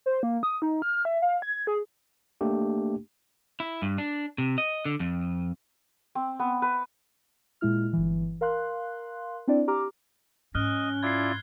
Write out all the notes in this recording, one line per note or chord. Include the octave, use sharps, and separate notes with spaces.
C5
A#3
D#6
D#4
F6
E5
F5
G#6
G#4
A3 A#3 D4 G4
E4
G2
D4
C3
D#5
D3
F2
C4
B3
B4
A#2 G#3 E4 F6
G1 E3
A#4 F5 C6 F#6
C4 D4 E4 D5
G4 A#5 D6 F6
G#2 C#4 D#5 F6 F#6 G7
E4 F4 D5 G#6 C7